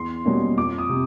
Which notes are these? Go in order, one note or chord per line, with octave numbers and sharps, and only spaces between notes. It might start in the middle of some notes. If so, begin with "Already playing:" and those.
Already playing: E2 C6
B2 G3 A#3 C#4
F2 D6
D#6
C3